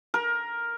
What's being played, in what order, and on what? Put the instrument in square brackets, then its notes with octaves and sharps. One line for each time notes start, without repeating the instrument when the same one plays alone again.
[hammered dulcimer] A#4